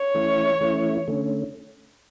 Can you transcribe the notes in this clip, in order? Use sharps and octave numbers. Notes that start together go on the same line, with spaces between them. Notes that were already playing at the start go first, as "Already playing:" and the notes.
Already playing: C#5
E3 A3 C#4 E4
E3 A3 C#4 E4
D3 A3 C#4